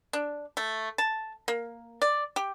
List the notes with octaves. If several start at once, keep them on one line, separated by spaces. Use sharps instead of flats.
D4
A3
A5
A#3
D5
G4